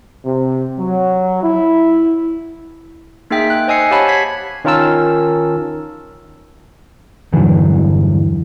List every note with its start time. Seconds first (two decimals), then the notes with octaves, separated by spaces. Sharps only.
0.25 C3
0.79 F#3
1.44 E4
3.31 A#3 D#4 G#4 E5 G5 B6
3.50 F#6
3.68 C5 D#5 G#5 E6 C7 C#7
3.91 G4 C#5 F5 F#5 A5 B5
4.08 G#6 B6 C7
4.65 D#3 C#4 F4 A#4 A5 E6
7.33 E2 G2 D3 E3 F#3